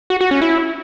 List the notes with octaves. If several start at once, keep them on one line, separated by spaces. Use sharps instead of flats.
F#4
F#4
C#4
E4